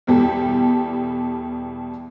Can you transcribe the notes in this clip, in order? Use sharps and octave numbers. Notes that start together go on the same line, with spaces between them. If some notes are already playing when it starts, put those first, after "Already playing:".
E2 B2 G3 G4 A4